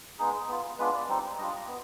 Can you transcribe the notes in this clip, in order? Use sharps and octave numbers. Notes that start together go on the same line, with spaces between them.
G#3 B3 D#4 G#4
B3 F4
G#3 B3 D4 F4 B4
D5
G3 C4 D#4
G3 D4 F4 D#5
B3